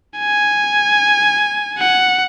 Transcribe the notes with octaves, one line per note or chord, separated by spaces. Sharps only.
G#5
F#5